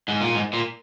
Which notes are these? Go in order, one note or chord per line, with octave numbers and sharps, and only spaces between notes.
G#2
A#2
G#2
A#2